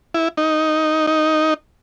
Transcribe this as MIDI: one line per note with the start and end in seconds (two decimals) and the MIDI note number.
0.14 0.28 64
0.37 1.07 63
1.07 1.54 63